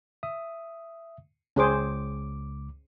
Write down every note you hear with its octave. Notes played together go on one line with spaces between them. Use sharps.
E5 D#6
C#2 C#4 G#4 C5 D6